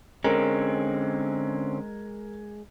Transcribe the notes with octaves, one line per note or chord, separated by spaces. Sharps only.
D3 G#3 C4 C#4 A#4